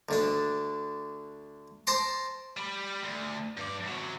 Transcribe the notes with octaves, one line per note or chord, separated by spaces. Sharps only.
D2 D3 D4
C5 A5 A#5 C6 D6
G3 B5
D2
G2 D5
C3 F#3